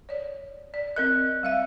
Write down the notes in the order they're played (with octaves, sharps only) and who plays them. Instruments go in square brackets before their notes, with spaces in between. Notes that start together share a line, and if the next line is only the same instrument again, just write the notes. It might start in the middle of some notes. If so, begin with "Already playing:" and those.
[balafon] C#5 D5
D5
[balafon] C4 A#4 D#5 [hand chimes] F#6
[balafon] G3 E5 F5